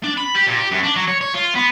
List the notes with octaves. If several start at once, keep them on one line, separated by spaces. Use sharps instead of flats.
D4
B5
G4
A#2
G4
F#2
D4
F#3
C#5
C#5
F4
B3